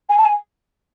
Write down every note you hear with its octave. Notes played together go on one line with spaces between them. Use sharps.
G#5
A5
G#5